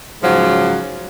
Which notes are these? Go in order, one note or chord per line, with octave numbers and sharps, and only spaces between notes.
G#2 C#3 F3 F#3